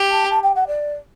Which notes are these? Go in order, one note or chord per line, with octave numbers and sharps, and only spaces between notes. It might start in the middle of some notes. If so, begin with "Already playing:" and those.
Already playing: G4
A5
A5
G5
F#5
D5